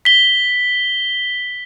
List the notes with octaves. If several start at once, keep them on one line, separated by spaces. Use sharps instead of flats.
B6 G7